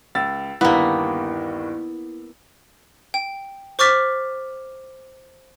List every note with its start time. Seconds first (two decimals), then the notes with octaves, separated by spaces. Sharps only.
0.15 C#2 E6 A6
0.61 G1 D#2 A#3 B3 E4
3.14 G5
3.79 C5 C#6 D6 F6 A6 B6